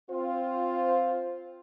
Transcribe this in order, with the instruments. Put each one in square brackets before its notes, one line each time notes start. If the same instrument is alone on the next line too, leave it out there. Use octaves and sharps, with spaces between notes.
[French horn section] C4 F4 C5